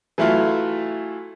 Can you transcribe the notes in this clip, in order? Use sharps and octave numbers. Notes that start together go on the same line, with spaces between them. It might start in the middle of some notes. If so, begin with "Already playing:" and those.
E3 F#3 A3 E4 F4